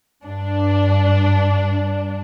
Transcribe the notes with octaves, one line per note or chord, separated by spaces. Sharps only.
G2 D4